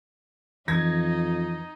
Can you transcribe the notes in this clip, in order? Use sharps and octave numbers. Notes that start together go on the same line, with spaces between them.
F2 E3 D#4 G#6 A#6